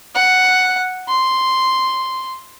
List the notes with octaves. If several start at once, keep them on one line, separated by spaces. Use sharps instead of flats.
F#5
C6